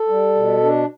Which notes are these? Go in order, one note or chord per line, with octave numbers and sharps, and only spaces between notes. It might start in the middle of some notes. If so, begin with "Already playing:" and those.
Already playing: A4
G3
B2
D4